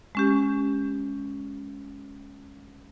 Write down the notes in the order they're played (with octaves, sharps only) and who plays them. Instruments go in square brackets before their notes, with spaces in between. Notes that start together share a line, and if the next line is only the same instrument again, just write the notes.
[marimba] G#3 C#4 G4